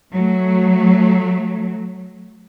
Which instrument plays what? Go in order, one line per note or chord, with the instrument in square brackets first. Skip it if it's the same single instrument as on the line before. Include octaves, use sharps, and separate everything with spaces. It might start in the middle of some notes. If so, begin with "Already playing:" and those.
[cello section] F#3 A3